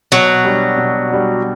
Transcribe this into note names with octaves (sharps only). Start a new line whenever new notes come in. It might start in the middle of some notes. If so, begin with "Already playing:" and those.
B2 F#3
G3 D4
B2
G3 D4